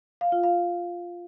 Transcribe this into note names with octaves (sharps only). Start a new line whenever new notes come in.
F5
F4
F5